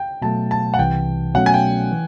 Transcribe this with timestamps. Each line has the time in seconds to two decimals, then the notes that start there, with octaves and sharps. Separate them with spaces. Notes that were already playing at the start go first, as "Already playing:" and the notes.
Already playing: G5
0.22 B2 F#3 A3 A5
0.51 A5
0.74 F#5
0.79 C2 C3 E3 G5
1.34 B2 F#3 A3 C#4 F#5
1.46 G#5
1.54 G5
1.91 E3